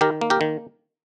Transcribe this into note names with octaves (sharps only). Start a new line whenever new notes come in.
D#3 G4 A#4
A#3
G4 A#4
D#3